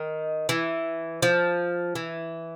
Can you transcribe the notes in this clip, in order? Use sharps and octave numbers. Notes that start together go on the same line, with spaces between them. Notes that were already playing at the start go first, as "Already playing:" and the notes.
Already playing: D#3
E3
F3
E3